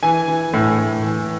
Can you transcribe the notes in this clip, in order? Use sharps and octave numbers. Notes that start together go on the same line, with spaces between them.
E3 G#5
E3
A2
A2
E3